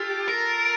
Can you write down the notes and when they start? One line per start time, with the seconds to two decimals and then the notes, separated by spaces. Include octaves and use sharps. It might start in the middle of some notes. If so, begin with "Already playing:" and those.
Already playing: F4 G4 A4
0.28 A#4